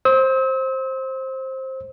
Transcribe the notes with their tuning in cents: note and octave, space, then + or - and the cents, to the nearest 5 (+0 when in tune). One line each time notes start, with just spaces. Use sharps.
C5 +15 E6 -40